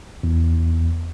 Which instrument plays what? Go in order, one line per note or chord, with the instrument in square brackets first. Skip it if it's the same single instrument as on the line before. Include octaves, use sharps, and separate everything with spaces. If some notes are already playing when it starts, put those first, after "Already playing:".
[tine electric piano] E2